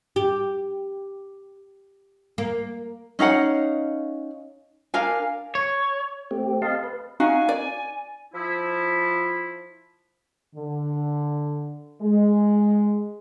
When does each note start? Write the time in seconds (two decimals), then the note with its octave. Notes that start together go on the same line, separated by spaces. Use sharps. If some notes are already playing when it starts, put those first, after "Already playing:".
0.16 G4
2.38 A#3
3.19 C#4 D#4 F5 F#5
4.94 D4 A#4 F5 G#5
5.55 C#5
6.31 A3 C4 G4
6.62 D#5 F5 A5 C6
6.84 B4
7.20 D#4 F#4 F5 G#5
7.49 D5
8.34 F3 E4
10.55 D3
12.02 G#3